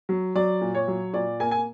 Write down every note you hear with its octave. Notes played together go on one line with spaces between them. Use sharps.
F#3
F#3 D5
A#2
C#5
F#3
A#2 D5
A#3 G#5
G#5